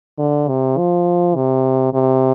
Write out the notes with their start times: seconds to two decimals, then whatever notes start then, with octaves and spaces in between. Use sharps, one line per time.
0.19 D3
0.48 C3
0.77 F3
1.35 C3
1.93 C3